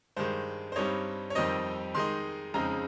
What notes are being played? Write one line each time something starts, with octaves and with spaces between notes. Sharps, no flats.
G2 D#3 G#3 C5
C5
G2 G3 C4 D#4 C#5
C#5
F2 D#3 G3 C4 D#4 D#5
D#3 G#3 D#4 C6
F2 C#3 G#3 C4 D#4 A#5